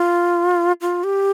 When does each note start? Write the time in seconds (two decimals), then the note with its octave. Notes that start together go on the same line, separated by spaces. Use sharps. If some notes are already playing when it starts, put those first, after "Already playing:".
Already playing: F4
0.81 F4
1.04 G4